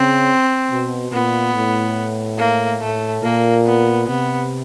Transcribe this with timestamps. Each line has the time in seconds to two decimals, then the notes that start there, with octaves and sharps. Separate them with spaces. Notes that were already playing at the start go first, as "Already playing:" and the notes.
Already playing: C#3 C4
0.70 B2
1.12 A#2 B3
1.54 A2
2.39 A#3
2.80 A2 A3
3.23 A#2 A#3
3.66 B3
4.07 C3 B3